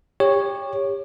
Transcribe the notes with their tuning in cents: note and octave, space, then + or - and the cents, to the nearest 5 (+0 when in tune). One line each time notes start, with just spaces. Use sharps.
G4 +30 C#5 +0